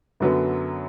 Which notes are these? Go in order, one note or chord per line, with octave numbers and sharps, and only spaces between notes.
F#2 D3 F#3 B3